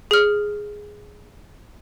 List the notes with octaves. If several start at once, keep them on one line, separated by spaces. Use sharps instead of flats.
G#4 F6